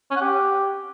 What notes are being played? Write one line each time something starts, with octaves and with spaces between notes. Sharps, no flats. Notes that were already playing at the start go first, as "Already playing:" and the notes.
C#4
F#5
G4